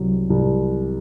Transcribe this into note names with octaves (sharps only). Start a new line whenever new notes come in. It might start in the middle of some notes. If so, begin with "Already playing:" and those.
Already playing: C2 C3 F#3
C2